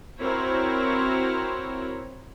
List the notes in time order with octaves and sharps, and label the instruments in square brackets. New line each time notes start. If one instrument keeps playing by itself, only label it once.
[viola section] C4 E4 F#4 A#4 C5 C#5